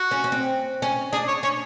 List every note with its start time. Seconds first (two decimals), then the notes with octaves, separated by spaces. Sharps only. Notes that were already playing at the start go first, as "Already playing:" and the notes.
Already playing: F#4
0.11 C#4
0.24 C#4
0.32 C4
0.82 C#4
1.13 D4 G#4
1.28 C#5
1.43 C#4 C#5